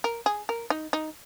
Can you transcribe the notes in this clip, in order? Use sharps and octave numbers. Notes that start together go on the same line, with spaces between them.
A#4
G#4
A#4
D#4
D#4